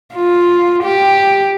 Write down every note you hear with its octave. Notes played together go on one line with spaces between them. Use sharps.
F4
G4